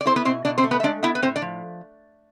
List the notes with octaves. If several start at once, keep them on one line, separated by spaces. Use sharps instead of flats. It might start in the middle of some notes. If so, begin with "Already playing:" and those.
D5
C4 E4 C5
B3 B4
B2 C4 C5
B2 D4 D5
C4 C5
A3
B3 B4
E5
G#3 D4 D5
B3 E4 E5
B4
A2 C4 C5
D4 D5
F3